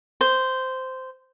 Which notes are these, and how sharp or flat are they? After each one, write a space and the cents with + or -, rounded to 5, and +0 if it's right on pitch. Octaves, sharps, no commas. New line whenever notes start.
C5 -10